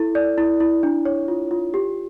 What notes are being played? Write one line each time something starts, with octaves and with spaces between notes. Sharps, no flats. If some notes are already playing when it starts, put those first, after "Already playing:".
Already playing: E4 A4
D5
E4
E4
D4
C#5
F4
F4
G4